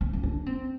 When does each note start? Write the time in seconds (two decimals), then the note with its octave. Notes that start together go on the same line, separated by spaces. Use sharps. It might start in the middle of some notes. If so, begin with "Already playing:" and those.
0.01 C4
0.13 C4
0.23 D4
0.46 C4